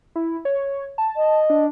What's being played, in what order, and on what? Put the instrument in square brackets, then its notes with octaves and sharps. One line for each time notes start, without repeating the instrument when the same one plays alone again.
[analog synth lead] E4
C#5
A5
[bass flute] D#5
[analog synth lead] D4